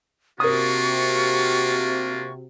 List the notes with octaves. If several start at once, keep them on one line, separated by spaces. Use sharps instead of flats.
C3 A#3 D4 F4 F#4 A#4 C#6 D#6